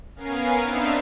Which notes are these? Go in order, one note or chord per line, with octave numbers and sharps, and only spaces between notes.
B3 C#4 A#4 F5 G#5 C7
B3 C4 D4 D#4 E5 F5